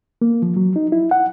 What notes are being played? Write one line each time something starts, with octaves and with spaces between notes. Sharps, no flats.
A#3
F3
F#3
D#4
E4
F#5